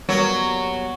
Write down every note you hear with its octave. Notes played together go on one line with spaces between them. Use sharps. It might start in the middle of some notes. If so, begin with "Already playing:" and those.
F#3 G3 A#3 B3